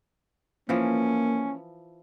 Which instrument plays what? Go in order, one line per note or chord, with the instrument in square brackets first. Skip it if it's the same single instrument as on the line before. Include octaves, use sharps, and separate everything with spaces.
[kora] E3 F3 [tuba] A#3 [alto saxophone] C#4